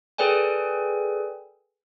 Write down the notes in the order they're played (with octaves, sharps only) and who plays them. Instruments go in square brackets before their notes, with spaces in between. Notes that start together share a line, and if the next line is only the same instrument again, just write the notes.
[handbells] G#4 A4 B4 D5 G5 G#5